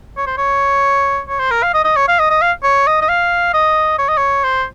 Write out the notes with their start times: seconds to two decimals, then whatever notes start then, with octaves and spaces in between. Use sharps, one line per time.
0.17 C#5
0.27 C5
0.38 C#5
1.29 C#5
1.40 C5
1.51 A#4
1.63 F5
1.74 D#5
1.85 D#5
1.96 C#5
2.08 F5
2.19 D#5
2.30 D#5
2.42 F5
2.63 C#5
2.87 D#5
3.02 D#5
3.09 F5
3.54 D#5
3.98 C#5
4.09 D#5
4.17 C#5
4.44 C5